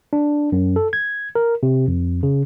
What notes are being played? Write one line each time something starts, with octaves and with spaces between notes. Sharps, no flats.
D4
F#2
A4
G#6
A#4
C3
F2
C#3